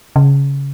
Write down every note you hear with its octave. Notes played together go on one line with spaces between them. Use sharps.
C#3